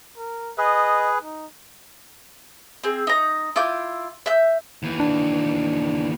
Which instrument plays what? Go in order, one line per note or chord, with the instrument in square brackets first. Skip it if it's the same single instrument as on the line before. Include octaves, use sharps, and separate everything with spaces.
[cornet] A#4
[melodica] G#4 B4 [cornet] D#5
[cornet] D#4
[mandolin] C4 G#4
D#4 A#5
E4 F4 D6 G6
E5 G6
[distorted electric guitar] D#2 E3
[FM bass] D4